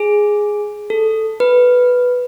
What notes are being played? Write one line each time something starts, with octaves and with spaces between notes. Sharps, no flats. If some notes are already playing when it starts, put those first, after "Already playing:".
Already playing: G#4
A4
B4